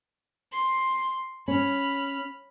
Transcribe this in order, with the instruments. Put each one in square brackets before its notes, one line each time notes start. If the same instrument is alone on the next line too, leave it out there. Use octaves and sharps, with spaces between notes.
[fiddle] C6
[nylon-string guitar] C#4 [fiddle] B5 F6